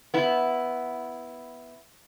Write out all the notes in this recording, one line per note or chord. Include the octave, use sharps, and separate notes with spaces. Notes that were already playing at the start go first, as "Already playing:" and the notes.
B3 E4